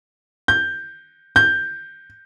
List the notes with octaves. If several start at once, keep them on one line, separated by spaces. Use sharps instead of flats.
G6
G6